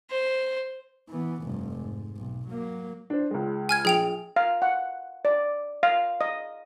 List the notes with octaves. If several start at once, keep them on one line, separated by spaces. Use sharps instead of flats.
C5
E3 B3
F1 G2
G#2
B1
F#3 A#3
D4 C5
C#2 G#3
G#5 F6 G#6
A#1 G#4 G5 F7
F5
F#5
D5
F5
D#5